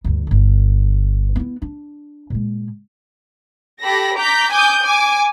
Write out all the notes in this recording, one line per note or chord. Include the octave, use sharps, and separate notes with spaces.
D2 G2
G1 D3
B3 E4
D4
A#2 G#3
G4 A4 B5 A#6
A#5 D6 G6 B6
G#5 D6 D#6 G6
G#5 D6